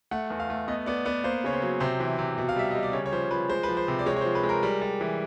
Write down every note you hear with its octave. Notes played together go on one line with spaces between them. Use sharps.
A3 F#5
E2
F5
A3
B3 D#5
B3 D5
B3 D5
A#3 C5
C#3 C#5
C5
F#3
C3 C5
E3
C3
B2
F5
G3 E5
G3 D#5
D5
C#3 C#5
C#5
F3 C5
F3 B4
G#3 C5
B4
F3
C5
C3
D5
G#3 C#5
C#5
C5
F3
B4
G#3
A#4
G3
G3
E3